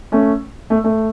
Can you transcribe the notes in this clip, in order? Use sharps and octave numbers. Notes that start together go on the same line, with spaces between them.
A3 C#4
A3
A3